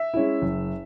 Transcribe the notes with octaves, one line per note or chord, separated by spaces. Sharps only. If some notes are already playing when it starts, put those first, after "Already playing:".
Already playing: E5
G#3 C#4 E4
F#1